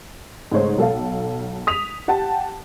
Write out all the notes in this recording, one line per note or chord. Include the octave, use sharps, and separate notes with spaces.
G#2 C#3 G#3 A3 C5 C#5
B1 A4 F5
D#6 B6 F7
G4 F#5 G5 A5